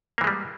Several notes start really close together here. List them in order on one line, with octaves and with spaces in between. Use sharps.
A#3 E3 G#3 G3